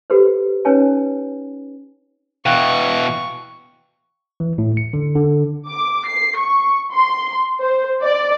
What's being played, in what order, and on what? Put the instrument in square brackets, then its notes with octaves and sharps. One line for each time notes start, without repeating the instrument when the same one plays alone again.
[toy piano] F#4 G4 A4 B4 C5
C#4 D#4 B4 C#5 G#5 A5
[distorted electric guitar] B2 E3 [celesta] F5 G5 F#6 [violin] C#6
[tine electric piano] E3
A2
C#7
D3
D3
[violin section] D6
C7
C#6
C6
C5
D5